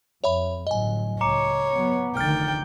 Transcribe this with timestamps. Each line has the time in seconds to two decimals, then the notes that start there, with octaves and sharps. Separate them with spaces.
0.24 F2 C#5 E5 B5
0.67 G1 A2 F#3 D#5 G#5
1.21 C#2 C#5 A#5 D6 C#7
1.71 F#3 B3
2.17 F1 D2 D#3 G5 F6 A6